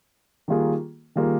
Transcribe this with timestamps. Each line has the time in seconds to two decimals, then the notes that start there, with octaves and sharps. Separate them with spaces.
0.48 D#3 G3 A#3 F4 G#4
1.16 D#3 G3 A#3 F4 G#4